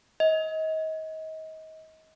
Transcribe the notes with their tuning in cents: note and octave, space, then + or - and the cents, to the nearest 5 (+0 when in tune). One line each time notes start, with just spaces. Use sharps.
D#5 +30